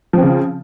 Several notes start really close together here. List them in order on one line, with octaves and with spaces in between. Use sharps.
F3 C4 C#3